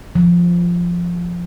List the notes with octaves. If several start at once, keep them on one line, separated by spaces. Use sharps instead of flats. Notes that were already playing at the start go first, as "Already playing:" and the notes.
F3